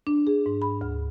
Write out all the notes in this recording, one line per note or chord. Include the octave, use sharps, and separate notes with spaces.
D4
G#4
G#2
B5
D2